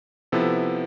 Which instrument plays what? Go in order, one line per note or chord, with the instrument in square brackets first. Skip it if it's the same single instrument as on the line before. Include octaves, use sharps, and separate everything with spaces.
[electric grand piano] C3 F3 B3 E4 A4